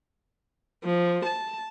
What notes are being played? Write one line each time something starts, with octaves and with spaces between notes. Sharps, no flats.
F3
A5